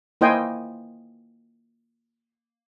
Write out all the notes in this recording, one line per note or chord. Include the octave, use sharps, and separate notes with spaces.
A#3 E4 C5 D#5 G5 G#5